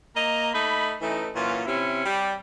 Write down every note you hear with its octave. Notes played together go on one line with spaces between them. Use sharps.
A#3 D#5 A#5
A3 D#4 B5
E3 A3 C#4 D#4
A#2 E3 F#3 C#4 F4
C3 C#4 E4
G3